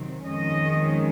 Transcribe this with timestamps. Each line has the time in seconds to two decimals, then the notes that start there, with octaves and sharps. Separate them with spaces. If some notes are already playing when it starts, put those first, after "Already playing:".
Already playing: C3 D#3 F#3 C4
0.28 F2 D#3 G#3 C#4 D#5